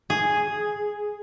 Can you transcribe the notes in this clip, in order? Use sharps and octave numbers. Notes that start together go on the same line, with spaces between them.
G#4